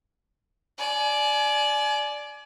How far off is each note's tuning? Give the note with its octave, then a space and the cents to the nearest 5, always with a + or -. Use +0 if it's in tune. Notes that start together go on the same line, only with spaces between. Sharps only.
D5 +0 G#5 +35